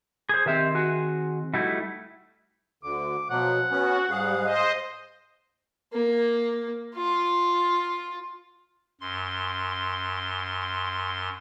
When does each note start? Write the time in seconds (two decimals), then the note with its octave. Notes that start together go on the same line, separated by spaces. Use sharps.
0.29 G#4 C5
0.46 D#3 C4 G4 E5
0.75 F#4 G#4
1.54 G3 A3 D#4 E4 F#4
2.83 D2 D3 D6
3.30 B2 F3 F#3 F#5
3.71 B3 C#4 F#4
4.10 G#2 G3 G#4 F5
4.42 C5 D#5
5.93 A#3
6.95 F4
9.01 F#2 C6